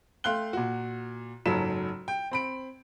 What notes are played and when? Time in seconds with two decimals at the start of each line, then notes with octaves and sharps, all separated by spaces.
0.24 A3 F5 G5 C6 F#6 G7
0.53 A#2 F#4
1.46 F#1 G#2 F#3 A4 B6 E7
2.08 G5
2.31 C4 B5 D7